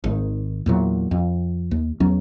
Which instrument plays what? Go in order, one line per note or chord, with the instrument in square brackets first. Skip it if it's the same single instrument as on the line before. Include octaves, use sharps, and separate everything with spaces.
[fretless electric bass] G#1 D#3
E2 A#2 F#3
F2
D#2
E2 F#3 C#4